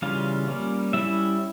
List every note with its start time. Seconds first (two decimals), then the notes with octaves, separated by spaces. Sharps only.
0.02 C#3 E3 G3 C#4 F4 F5
0.48 G3 A#3 C#4
0.93 G3 C#4 E4 E5